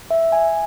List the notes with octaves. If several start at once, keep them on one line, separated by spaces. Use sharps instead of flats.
E5
G#5